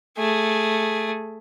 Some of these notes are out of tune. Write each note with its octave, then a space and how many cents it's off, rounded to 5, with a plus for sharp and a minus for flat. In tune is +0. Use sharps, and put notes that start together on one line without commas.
A3 +0 G#4 +0